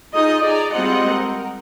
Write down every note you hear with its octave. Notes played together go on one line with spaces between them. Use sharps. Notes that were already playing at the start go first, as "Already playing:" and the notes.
D#4 F4 G#4 D#5
G#4 D5 A#5
G3 G#3 C4 F4 D#5 F#5
A#4